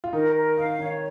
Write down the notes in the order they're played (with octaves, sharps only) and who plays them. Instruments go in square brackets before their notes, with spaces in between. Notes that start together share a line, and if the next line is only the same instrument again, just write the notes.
[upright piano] F4
[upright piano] D#3 D#4 [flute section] A#4
[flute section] A#4
[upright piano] D#3 D#4 [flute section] F5
[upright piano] D#3 D#4 [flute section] C#5